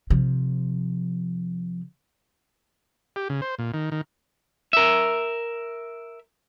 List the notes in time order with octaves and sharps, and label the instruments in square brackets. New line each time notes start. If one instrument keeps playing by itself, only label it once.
[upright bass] C3 F3
[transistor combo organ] G4
C#3
C5
A#2
D#3
D#3
[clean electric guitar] A#4 E5